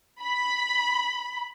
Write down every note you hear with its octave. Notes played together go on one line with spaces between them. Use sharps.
B5